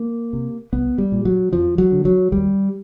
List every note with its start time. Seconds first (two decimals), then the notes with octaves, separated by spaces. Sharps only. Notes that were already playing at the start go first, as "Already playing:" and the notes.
Already playing: A#3
0.33 C3
0.72 C2 B3
0.98 G3
1.12 A#2
1.25 F#3
1.52 F2 F3
1.78 F#3
1.92 D3
2.05 F#3
2.32 D#2 G3